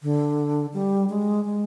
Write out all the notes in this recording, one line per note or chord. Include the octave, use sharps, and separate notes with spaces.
D3
G3
G#3
G#3